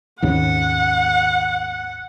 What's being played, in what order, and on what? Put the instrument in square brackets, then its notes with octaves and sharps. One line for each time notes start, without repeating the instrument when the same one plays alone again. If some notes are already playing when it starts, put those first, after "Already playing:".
[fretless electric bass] G#1 D#2 C#3 [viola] F#5